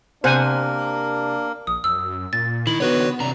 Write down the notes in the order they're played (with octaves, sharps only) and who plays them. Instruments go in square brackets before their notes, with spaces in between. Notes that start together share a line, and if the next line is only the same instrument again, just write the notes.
[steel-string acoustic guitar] C3 [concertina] A#3 A#4 [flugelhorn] D4 [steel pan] C5 F#5 G#5
[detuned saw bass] A#1 [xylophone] D#6
[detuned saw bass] F#2 [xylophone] E6
[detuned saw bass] A#2 [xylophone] A6
[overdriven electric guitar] D#3 [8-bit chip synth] E4 [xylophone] F#7
[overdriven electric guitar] D3 D#4 [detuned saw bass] B3 [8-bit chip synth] F#4 B4 C#5
[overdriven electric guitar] C3 D4 [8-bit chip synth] A#5